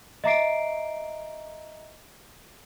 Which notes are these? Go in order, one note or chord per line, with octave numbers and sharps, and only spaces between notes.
D#5 E5 A#5 D6 C7 D7